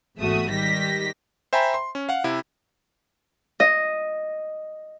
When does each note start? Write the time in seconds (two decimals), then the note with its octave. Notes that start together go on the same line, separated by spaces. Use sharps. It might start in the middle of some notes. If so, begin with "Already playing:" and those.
0.18 G#1 E2 A3 F#4 E5 D#6
0.50 D#3 G3 G4 A#6 B6
1.53 C5 E5 G5 G#5 A#5 B5
1.74 C6
1.95 C#4
2.09 F5 F#5
2.24 C3 E4
3.60 D#5